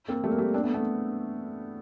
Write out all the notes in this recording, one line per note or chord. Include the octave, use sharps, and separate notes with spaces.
A#3 C4
G3 A3
A#3
G3 A3
C4 D4
A3 B3
A3 B3